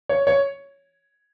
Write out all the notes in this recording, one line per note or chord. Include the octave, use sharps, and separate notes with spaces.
C#5
C#5